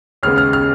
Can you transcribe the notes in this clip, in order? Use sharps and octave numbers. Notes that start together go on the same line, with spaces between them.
D#2 C#3 G#3 B3 F6
F6
F6